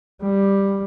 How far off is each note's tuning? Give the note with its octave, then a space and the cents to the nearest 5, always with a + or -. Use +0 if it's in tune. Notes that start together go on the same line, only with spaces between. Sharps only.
G3 +5